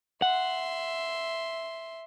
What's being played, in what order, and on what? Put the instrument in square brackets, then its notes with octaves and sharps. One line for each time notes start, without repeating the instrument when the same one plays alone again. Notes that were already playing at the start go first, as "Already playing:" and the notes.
[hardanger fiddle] E5 C6 [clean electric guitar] F#5